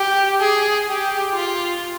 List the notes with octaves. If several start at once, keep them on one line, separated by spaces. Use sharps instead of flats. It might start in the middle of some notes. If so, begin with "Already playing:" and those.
Already playing: G4
G#4
G4
F4